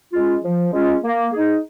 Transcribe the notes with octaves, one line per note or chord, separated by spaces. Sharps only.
G#3 C#4 F4
F3
G#3 C#4 F4
A#3
D#4 G#4